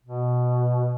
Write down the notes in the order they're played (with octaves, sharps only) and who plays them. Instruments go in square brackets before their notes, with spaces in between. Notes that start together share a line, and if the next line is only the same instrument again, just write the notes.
[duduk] B2